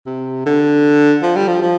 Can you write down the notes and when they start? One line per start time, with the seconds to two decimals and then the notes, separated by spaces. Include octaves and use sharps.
0.06 C3
0.46 D3
1.22 F3
1.36 G3
1.48 F3
1.62 F3